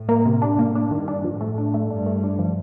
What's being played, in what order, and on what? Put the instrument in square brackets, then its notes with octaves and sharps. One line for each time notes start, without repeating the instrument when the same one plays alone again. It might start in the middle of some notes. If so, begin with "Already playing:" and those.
Already playing: [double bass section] A2
[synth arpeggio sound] A#3
C3
D4
[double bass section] A2 [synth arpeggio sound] A#3
[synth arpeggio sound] D4
[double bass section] G2 [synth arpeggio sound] D#3
[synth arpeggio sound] D4
[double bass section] A2 [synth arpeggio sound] F3
[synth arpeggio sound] A3
D4
A3
[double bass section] G2 [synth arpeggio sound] D4
[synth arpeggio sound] A3
D4
F3